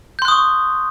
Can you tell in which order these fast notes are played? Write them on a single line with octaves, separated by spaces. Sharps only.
G6 C6 F#6 D#6 C#6